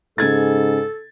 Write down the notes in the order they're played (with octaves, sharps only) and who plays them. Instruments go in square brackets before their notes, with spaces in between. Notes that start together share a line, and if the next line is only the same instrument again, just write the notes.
[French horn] G#2 [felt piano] C#3 G#6 A6 [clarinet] A4